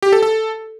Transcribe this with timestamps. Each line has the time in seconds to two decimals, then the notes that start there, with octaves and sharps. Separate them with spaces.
0.02 G4
0.13 A4
0.23 A4